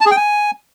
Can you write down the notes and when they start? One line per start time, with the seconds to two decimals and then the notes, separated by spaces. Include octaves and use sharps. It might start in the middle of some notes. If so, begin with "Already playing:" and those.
0.01 A5
0.06 G#4
0.11 G5
0.16 G#5